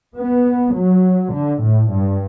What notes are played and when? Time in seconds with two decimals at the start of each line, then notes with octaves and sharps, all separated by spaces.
0.16 B3
0.75 F#3
1.33 D3
1.62 A2
1.91 G2